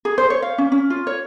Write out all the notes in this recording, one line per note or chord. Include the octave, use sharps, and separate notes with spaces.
G#4
C5
C#5
F5
C#4
C#4
F4
C#5